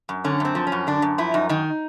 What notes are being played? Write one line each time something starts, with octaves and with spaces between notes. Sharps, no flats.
F#2
D3 C#4
F#2 C4
F3
C#4
F#2
D3 D4
F#2
F3 E4
F#2 D#4
D#3 D#4